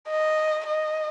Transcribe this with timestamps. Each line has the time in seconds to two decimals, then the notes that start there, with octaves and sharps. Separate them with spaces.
0.09 D#5
0.67 D#5